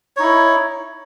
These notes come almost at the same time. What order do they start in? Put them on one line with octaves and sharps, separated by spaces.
C#5 D#4 E4